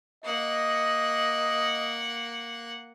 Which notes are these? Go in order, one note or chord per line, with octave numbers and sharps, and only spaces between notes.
A#3 D#5 F#5